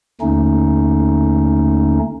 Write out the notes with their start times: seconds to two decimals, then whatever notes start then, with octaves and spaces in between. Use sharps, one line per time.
0.21 D#2 D3 A3 C#4 D#4